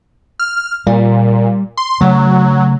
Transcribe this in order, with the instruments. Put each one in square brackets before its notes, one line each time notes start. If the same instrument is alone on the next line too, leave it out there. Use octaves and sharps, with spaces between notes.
[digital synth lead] F6
[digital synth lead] A#2 [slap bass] G3
[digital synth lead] C6
[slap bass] C#3 A3 [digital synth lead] F#3